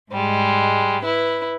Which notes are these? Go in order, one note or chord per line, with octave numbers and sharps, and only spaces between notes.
G#2 G3 G#3
E4 B4